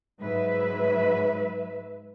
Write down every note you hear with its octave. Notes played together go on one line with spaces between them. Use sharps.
G#2 F#3 B4 E5